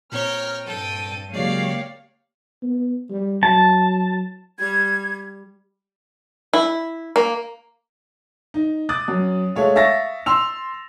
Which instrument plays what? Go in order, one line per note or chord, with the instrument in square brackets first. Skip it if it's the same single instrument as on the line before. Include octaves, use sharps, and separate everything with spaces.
[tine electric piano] A#2 C4 [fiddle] C#5 G5 [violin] A#5 F6
[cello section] G2 [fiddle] A4 G5 [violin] D#7
[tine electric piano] C#3 F#3 G#3 [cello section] A#3 C#5 F5 [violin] G4 [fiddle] D5
[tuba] B3
G3
[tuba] F#3 [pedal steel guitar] A5
[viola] G3 [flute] G#6
[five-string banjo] E4
A#3
[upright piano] D#4
D6 D#6 F#6 A6
F#2
G#3 A3 C#5 F5
E5 F5 C#6 A6 A#6
C6 E6 F7